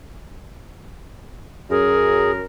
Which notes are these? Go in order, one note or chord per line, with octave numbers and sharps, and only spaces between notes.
F#2 G#4 A#4